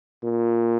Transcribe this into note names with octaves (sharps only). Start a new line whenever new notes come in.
A#2